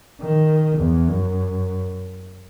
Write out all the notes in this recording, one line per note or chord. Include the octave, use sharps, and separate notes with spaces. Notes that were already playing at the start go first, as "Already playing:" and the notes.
D#3
E2
F#2